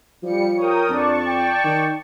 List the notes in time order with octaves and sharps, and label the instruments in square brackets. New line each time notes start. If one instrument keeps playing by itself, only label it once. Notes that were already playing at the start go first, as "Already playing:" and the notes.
[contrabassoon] F3 [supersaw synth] G3 C#7
[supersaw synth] A#4 G5 D#6 [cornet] C#5
[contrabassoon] F2 [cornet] D4 [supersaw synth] D5 A5 C#6
[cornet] G5
[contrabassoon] D#3